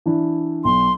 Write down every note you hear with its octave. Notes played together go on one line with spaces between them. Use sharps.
E3 D4 E4
B1 C6